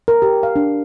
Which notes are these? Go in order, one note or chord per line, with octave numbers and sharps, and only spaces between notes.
A#4
G4
F5
D4